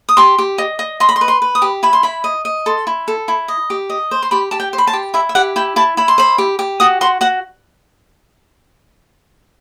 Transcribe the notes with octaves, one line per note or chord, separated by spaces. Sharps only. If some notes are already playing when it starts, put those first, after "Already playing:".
D#6
G4 C6
G4
D#5
D#5
D#5 C6
B5
C6
B4
C6
B4
D#6
G4
E4 B5
C6
E4 B5
D#5
D#5
A4 C6
E4
A4
E4
D#5
G4
D#5
C5
C6
G4 B5
G4 A5
G5
C5
B5
A5
G4
E4 E5
E5
G4 F#5
E4 G5
E4 A5
E4 B5
C6
C5 B5
G4
G4
F#4 D#6
F#4 C6
F#4 F#5